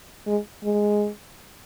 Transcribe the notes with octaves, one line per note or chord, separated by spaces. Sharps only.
G#3
G#3